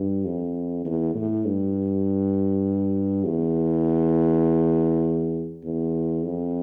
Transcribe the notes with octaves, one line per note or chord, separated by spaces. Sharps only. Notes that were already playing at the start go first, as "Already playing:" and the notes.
Already playing: G2
F2
E2
A2
G2
E2
E2
F2